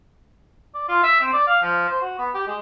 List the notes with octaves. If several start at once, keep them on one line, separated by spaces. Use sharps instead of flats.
D5
F4
E5
C4
D5
F5
F3
C5
F#4
B3
G4
G#3